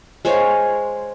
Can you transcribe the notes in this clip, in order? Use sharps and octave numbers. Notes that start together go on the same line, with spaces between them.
G#3 C5 C#5 F5